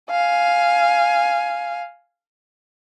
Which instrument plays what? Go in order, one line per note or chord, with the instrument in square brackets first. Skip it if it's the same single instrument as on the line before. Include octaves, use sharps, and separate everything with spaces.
[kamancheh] F5 G#5